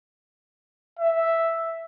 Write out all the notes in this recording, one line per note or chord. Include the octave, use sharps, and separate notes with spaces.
E5